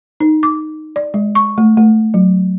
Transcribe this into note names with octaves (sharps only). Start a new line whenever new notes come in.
D#4
D6
D5
G#3
C#6
A3
A3
F#3